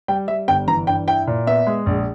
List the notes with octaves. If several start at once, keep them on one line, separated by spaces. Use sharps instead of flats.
G3 G5
G3 E5
G1 G5
E3 A#5
G2 G5
E4 G5
A#2
B3 E5
G#3
A#1